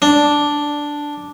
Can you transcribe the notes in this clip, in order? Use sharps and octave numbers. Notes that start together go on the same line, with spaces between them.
D4